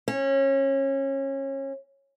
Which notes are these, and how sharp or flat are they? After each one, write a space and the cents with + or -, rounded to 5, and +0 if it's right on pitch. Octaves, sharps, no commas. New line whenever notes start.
C#4 -25